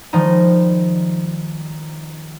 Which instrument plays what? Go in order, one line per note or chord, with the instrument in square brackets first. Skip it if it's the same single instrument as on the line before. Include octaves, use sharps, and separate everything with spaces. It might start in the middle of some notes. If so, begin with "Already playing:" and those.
[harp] D#3 F3 G3 G#3 D#4